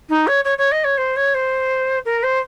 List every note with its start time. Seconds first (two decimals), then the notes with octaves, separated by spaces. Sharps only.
0.09 D#4
0.27 C#5
0.44 C#5
0.58 C#5
0.71 D#5
0.84 C#5
0.97 C5
1.16 C#5
1.34 C5
2.05 A#4
2.23 C5